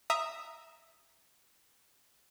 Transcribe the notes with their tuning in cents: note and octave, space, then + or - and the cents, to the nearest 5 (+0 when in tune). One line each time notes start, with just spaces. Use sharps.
E5 +0 A#5 +0 D#6 +0